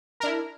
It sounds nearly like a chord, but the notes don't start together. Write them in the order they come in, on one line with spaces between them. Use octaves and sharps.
A#4 D4 E4